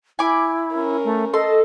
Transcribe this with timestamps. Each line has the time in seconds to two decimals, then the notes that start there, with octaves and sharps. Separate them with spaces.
0.19 E4 G#5 B5 D6
0.74 C#4 A#4
1.04 A3
1.34 A4 D#5 C6